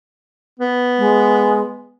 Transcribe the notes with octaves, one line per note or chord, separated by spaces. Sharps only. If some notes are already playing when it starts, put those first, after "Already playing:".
B3
G#3